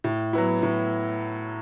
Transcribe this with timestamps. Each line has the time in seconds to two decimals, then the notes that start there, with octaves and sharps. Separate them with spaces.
0.04 A2
0.33 F#3 B3 E4
0.63 A2